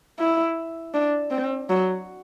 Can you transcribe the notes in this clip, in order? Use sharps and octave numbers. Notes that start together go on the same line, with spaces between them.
E4
D4
C4
F#3